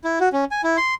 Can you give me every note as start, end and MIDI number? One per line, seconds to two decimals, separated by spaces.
0.04 0.19 64
0.20 0.29 66
0.33 0.45 61
0.51 0.61 80
0.64 0.77 64
0.77 0.95 84